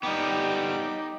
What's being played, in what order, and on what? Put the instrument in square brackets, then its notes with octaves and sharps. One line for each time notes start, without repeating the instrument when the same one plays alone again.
[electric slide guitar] G3 B3 [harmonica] D#4 G5 D6